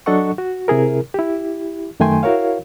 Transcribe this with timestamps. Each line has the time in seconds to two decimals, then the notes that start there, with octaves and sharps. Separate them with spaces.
0.06 F#3 D4 A4 D#5 F#5 C#6
0.38 F#4
0.68 C3 E4 G#4 A#4
1.14 E4 G4
2.00 F#2 D#3 A3 G5 G#5 C6
2.23 E4 F#4 A#4 C#5 F5